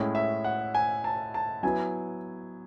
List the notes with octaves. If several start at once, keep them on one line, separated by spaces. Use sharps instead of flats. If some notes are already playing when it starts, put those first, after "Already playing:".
Already playing: A2 G#3 C#4 E4
E5
F#5
G#5
A5
A5
F#3 B3 E4 G#5